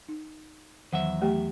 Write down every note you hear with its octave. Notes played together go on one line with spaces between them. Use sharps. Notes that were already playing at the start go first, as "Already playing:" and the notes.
D#4
E2 D#3 F#3 E5 F#5
A3 G4 G5